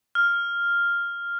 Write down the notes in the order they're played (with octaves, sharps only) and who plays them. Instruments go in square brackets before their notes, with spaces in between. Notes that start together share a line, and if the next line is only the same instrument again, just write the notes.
[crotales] F6